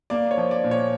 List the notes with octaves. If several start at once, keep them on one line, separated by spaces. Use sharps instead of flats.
A#3 D5
C#5
F3
D5
A#2
C#5